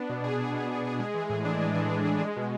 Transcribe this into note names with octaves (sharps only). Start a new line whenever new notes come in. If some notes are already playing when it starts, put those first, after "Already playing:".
Already playing: B3 D4
B2
G#4
D4
B3
B2
G#4
G#3
E3
A2
D4
G#3
E3
A2
D4
G#3
B2